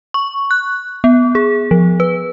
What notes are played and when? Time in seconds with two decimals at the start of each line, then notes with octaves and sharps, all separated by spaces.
0.14 C#6
0.51 F#6
1.04 B3
1.35 G#4
1.71 F3
2.00 B4